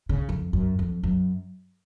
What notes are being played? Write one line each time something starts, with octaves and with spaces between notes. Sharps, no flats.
C#3
F2
F#2
F2
F#2